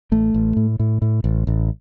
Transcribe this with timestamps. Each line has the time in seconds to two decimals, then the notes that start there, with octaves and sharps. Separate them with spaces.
0.12 A1 A3
0.34 A1
0.57 A2
0.80 A2
1.02 A2
1.24 A1
1.47 A1